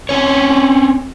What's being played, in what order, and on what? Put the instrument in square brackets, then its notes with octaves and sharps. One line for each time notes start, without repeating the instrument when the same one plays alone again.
[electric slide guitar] C4 C#4 C#5